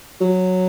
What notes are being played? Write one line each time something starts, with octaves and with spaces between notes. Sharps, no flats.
F#3